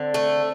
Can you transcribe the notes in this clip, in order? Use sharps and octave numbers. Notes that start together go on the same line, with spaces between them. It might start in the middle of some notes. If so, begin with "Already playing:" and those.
Already playing: D3 C4
A3